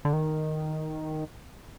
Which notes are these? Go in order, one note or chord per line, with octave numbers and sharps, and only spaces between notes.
D3
D#3